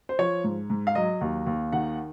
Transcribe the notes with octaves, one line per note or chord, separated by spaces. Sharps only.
C5
F3 C#5
G#2
G#2
F5
F#3 D#5
D#2
D#2
D#3 F#5